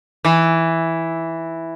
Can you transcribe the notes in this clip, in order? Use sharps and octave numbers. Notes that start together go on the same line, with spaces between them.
E3